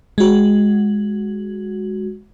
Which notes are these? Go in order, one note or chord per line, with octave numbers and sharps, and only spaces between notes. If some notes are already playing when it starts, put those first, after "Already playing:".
G#3 F#4